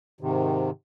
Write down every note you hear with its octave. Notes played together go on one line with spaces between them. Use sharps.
G#2 C3 D#3